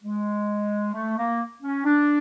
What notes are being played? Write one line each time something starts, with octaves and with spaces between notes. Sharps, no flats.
G#3
A3
A#3
C#4
D4